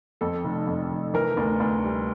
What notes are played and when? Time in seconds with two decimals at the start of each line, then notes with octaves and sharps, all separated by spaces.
0.21 F2 A4
0.44 F1
0.67 F2
0.91 F1
1.14 E3 A#4
1.37 D2
1.60 D2
1.84 G3